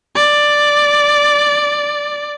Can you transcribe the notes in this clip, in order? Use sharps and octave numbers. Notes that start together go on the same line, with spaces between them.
D5